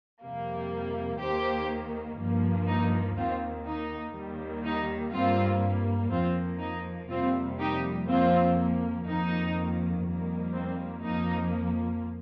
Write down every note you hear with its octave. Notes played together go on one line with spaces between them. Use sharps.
F2 C3 G3 A#3
D#2 D#3 A#3 G4 C5
G2 F3 A#3
D#4
D#2 D#3 A#3 C4 F4
D#4
D#2 D#3 G3 A#3
D#4
G2 G3 A#3 C4 F4
F2 F3 A#3 C4 F4
D#4
F2 C3 G3 A#3 C4 F4
D#4 G4
F2 F3 A#3 C4 F4
F2 D#3 A#3 D#4
F2 D#3 G3 A#3
C4
F2 F3 A#3 D#4